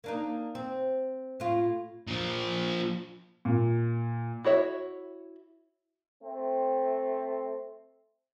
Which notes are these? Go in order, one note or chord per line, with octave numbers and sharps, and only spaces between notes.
A#3 D4 D#4
C4
A2 F4
A#2 F3
A#2
E4 F#4 C#5 E5
A3 C4